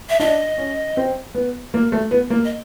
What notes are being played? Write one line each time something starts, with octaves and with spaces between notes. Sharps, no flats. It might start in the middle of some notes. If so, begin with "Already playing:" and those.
E5
D4 D#5
C#4
C4
B3
A#3
A3
B3
A#3
D#5